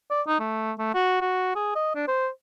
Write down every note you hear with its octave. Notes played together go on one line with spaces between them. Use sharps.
D5
D#4
A3
A3
F#4
F#4
G#4
D#5
D4
C5